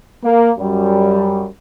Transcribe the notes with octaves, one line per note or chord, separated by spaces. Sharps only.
A#3
F#2 G3